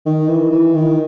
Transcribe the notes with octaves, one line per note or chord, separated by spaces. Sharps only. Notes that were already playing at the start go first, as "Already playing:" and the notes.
D#3
E3
E3
D#3